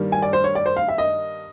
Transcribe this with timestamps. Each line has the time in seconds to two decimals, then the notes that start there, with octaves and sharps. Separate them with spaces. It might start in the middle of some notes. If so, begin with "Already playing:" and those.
Already playing: G2 D#3 G3 A#3 D4
0.12 G#5
0.22 D5
0.33 C5
0.44 C#5
0.55 D5
0.66 C5
0.76 F5
0.89 E5
0.98 D#5